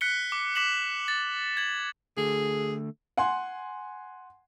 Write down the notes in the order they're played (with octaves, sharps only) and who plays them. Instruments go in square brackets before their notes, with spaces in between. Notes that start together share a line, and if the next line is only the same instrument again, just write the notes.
[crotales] F#6 B6 C#7 G7
D6
D6 B6 E7 F#7
A6
G#6 F#7
[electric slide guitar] D3 A3 [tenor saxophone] G#4
[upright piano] F#5 G#5 C6